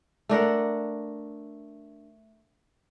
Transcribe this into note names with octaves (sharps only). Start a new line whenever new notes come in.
A3 D4 A#4 F#5